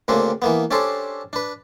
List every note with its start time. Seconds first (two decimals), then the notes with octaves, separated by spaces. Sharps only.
0.08 D2 C#3 A#3 C4 D4
0.42 E3 A#3 B3
0.71 C#4 D4 G4 A4 C5
1.33 D4 B4